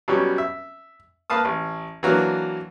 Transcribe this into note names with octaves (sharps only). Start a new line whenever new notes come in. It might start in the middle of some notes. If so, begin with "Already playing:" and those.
B2 F#3 G3 C#4
E5
A#3 B4 F5 A5 D#6
A1
E3 F#3 A#3 D4